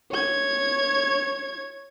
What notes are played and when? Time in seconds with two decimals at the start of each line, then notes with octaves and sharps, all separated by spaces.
0.11 C#5 G#6